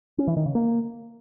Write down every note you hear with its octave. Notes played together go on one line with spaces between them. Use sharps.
C#4
E3
D#3
C#3
A#3